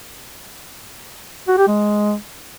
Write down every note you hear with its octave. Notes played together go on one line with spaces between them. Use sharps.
F#4
G4
G#3